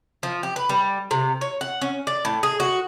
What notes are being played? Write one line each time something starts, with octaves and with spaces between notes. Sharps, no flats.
F3
G4
B4
G3
C3
C#5
F#5
C#4
D5
A2
G#4
F#4